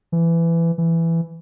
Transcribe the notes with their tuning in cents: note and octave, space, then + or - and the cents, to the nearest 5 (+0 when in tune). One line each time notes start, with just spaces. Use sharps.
E3 +20
E3 +10